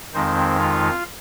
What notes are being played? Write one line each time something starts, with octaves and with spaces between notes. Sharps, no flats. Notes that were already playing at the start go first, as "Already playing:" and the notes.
F2 D#3 G#3 C4 D#4 C5
F4 F5